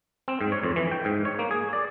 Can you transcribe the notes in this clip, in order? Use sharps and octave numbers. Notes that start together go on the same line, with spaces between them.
C4
G#2
C#5
F2
E3
G5
G#2
C#5
A#3
G#4
D5